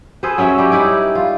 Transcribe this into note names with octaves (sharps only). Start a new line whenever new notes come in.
G#4 A4 B4 C5
F#3 C#4 A#4 E5
G3 G4
D#4 E4 D5
F4